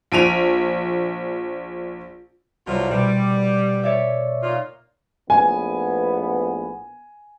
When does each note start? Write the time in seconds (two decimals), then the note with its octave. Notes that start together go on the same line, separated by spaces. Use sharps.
0.12 A#1 D7 D#7 F7
2.67 C2 B2 F#3 F4
2.91 B2 G3
3.83 C#5 D5 E5
4.43 A#2 D#4 F4
5.30 A#1 A2 B3 G#5